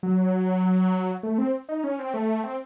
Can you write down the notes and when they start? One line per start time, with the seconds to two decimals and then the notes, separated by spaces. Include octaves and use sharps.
0.03 F#3
1.23 A3
1.38 C4
1.69 D#4
1.84 C#4
1.99 C4
2.14 A3
2.44 C4